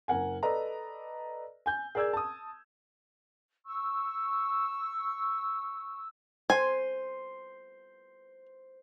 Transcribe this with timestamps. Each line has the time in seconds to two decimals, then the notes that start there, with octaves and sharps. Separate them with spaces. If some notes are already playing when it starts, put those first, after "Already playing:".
0.08 F#1 A#4 F#5 G#5
0.43 A4 B4 D5 D#5 A#5
1.66 G#5 G6
1.95 G#4 A#4 D5 E6 G6 G#6
2.13 A5 D#6
3.65 C#6 E6
6.50 C5 G#5